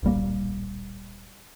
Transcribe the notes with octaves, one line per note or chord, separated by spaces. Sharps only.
D1 A#1 G3 A#3